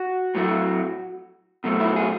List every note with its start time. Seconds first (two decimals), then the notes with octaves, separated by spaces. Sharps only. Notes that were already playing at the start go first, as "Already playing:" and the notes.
Already playing: F#4
0.35 A2 F#3 A3
1.64 B2 F#3 A3
1.80 E4
1.96 G#4